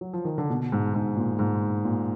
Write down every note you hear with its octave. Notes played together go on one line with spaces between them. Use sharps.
F#3
F3
D#3
D3
B2
G#2
G#2
A#2
G#2
A#2